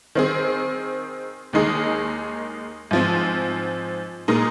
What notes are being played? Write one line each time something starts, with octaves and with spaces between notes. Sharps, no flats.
D#3 C4 G#4
D#2 D#3 G#3 D#4 G#4
G#2 F3 C4
A#2 G#3 D#4 A#4